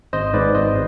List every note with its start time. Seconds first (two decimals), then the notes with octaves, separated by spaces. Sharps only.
0.13 G#1 C5 D#5
0.34 G#2 B4 D5
0.55 G#1 C5 D#5